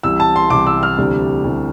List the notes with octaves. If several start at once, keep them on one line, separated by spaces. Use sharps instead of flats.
C2 C3 E3 E6
A5
C6
C2 C3 E3 D6
E6
F6
D2 C3 E3 G3 D4
D2 C3 E3 G3 D4